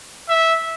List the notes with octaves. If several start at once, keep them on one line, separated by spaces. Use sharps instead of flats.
E5